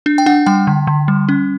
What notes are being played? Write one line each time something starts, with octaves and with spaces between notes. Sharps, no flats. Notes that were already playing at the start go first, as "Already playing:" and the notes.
D4
G5
D4 F#5
G3 G5
D3
D3
G3
C#4